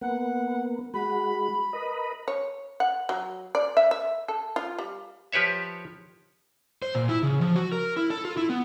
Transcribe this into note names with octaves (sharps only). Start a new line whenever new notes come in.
A#3 B3 F#5
G#3 F#4 B5
A#4 B4 D#5
C#5
F#5
F#3
D5
E5
E5
A4
F4
G3
F3 G4 B4 C#5 E5
C5
A#2
E4
C#3
F3
F#4
A#4
E4
A4
F4
E4
B3